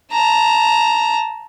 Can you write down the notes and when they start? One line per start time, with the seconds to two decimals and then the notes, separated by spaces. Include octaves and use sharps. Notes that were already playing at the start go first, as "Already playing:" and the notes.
0.12 A5 A#5